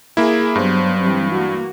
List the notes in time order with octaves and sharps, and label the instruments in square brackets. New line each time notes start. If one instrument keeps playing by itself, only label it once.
[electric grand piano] A#3 E4 [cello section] G#4
[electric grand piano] G2 [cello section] F#3 B3 C5
[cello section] E3 G3 C4
A#3 F#4